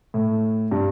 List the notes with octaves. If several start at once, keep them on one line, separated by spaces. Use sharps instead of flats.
A2
G2